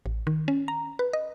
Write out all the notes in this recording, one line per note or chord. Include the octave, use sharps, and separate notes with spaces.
A1
D#3
C#4
A#5
B4
D#5